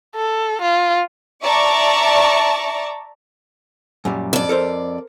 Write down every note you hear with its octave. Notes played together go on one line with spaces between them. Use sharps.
A4
F4
D5 E5 A5 A#5 C#6 D6
F#2 A#2 G3
F2 D5
A4 A#4 C5